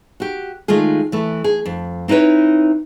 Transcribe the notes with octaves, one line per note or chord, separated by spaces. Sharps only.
F#4 G4
D#3 G#3 A3 F4 G#4
E3 A3
G#4
F2
C4 D#4 E4 B4 C#5